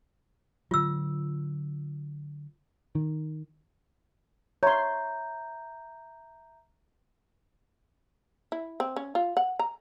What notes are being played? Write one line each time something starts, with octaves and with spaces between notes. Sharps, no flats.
D3 F#3 F4 E6
D#3
C#5 E5 A#5 C6 G6
E4
C4
C#4
F4
F#5
A#5